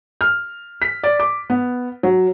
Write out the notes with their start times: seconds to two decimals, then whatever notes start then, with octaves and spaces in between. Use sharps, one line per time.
0.21 F6
0.82 B6
1.03 D5
1.20 D6
1.50 B3
2.03 F#3